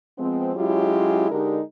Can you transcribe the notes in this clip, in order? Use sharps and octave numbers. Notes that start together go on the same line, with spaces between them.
F3 G#3 B3 C4
F#3 G#3 C#4 E4 F4 G4
D3 G#3 D4 D#4 G4 A#4